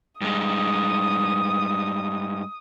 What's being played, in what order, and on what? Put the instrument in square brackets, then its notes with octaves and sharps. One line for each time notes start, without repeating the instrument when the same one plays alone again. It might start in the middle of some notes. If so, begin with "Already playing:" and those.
[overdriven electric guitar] G2 G#3 [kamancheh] D#6